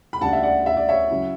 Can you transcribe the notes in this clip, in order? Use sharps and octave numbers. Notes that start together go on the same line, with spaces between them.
B5
D2 C#3 G3 D4 F#5 A5
E5
D5 F#5
E5
D5
C#5 E5
C#3 F#3 C#4 E4